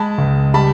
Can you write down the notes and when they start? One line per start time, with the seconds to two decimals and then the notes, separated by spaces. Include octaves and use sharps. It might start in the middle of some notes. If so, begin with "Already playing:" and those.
Already playing: G#3 A5 B5
0.18 C#2
0.54 G3 A5 B5